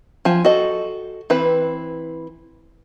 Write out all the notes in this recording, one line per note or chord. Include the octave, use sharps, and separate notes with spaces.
F3 G#5
F#4 A4 D#5
E3 C4 B4